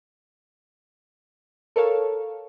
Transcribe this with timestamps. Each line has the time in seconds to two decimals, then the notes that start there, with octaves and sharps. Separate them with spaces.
1.76 A4 A#4 C#5 F5